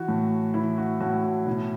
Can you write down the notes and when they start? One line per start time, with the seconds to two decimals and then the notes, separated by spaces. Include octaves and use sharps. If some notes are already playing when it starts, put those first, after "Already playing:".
Already playing: E3 F#4
0.08 A2
0.54 E3 E4
0.78 F#4
1.00 A2 F#4
1.23 F#4
1.46 B2 E4